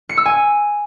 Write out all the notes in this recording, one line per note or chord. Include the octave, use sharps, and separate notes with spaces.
C#7
E6
G#5